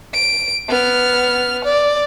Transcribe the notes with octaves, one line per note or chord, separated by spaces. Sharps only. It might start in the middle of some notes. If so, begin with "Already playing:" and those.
D7
B3 F6
D5